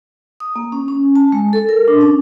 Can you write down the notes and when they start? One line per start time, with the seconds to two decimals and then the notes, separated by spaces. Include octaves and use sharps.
0.40 D#6
0.56 A#3
0.72 C#4
0.88 C#4
1.16 A5
1.32 G#3
1.53 A4
1.69 A#4
1.88 D4
2.01 C#4